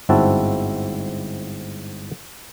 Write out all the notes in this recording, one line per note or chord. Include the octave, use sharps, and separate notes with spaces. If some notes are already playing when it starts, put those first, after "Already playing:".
G1 G#2 C4 E4 F#4 A5